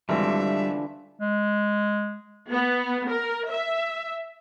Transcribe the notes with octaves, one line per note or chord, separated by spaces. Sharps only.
G#1 D3 E3 F3 G3 E5
G#3
B3
A#4
E5